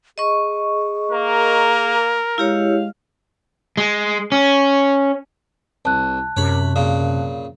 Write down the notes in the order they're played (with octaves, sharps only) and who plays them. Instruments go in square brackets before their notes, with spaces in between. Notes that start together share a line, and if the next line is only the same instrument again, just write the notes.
[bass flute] G#4 [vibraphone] D#5 C#6
[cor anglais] A#3 [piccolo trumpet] A#4
[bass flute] G#3 [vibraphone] E4 G4 C#5 [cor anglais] F5
[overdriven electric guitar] G#3
C#4
[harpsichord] C2 [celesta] A5 F#6
[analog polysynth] F#2 C3 [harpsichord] C#5 B5
[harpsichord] A#2 C#3